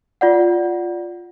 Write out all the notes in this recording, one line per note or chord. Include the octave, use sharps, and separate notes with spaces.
F4 D5 F#5